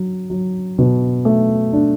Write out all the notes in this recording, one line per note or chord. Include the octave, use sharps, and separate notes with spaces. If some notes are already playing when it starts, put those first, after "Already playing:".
Already playing: F#3
F#3
B2
A3
D4